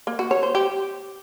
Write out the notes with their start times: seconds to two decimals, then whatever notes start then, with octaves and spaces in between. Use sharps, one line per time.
0.07 A#3
0.19 F#4
0.31 C#5
0.43 C5
0.55 G4